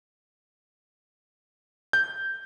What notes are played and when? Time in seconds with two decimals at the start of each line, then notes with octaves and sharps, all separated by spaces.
1.93 G6